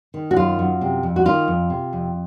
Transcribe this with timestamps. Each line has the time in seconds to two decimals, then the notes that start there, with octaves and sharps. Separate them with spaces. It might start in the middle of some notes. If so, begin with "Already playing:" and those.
0.14 D#3
0.31 F#4
0.36 F#2 F4
0.59 F#2
0.81 C3
1.03 F2
1.16 F#4
1.25 D#3 F4
1.48 F2
1.70 C3
1.93 F2